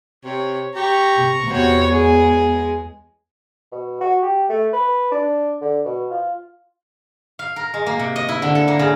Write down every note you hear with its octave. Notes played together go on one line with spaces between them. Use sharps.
C3 C#5
G4 A#5 C#6
C3
E2 C3 B3 F#4 C#5
G#3 G#4
B2
F#4
G4
A3
B4
D4
D3
B2
F4
F5
A#4
G#3
A#3
C3
D#5
E4
D3
A4
A#3
C#3